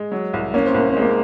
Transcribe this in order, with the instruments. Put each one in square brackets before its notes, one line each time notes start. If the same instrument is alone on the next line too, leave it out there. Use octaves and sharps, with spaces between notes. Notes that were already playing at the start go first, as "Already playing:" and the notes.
Already playing: [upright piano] G#3
F#3
C2
[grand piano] A#3 [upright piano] C#4
[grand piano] C4
[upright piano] C2 [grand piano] A#3
[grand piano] C4
[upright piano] G#3
[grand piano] A#3